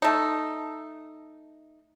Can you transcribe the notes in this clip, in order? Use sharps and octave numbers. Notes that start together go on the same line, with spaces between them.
A3 D#4